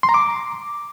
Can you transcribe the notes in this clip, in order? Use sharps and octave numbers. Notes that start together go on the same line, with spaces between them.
C6
A#5
D6